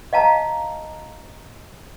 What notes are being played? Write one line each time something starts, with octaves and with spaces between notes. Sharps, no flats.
D#5 F5 A5 A#5